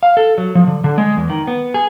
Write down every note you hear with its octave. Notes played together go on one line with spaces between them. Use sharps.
F5
A4
F#3
F3
D3
D3
G#3
E2
D#3
B3
G#4